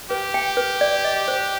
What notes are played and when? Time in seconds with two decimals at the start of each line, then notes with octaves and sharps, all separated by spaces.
0.10 G4 B4
0.34 G5
0.57 B4
0.81 D5
1.04 D#5
1.28 C5